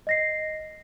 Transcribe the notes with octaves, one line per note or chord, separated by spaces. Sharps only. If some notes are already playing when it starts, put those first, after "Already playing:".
D#5 A#6 C7